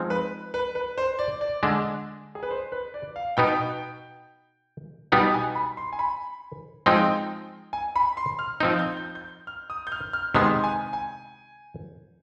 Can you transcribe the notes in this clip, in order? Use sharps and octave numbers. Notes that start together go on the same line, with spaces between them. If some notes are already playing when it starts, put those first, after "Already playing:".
Already playing: F3 G#3 C4 D#4
B4
B4
B4
C5
D5
D5
D3 G#3 D4
G#4
B4
C5
B4
D5
F5
B2 B3 D#4 G5
B2 G3 B3 D#4 G5
G#5
B5
C6
G#5
B5
F3 G#3 C4 D#4 G5
G#5
B5
C6
F6
F3 C4 D#4 G6
G6
G6
G6
F6
D#6
G6
F6
F6
C3 D#3 G#3 B3 C6
G#5
G#5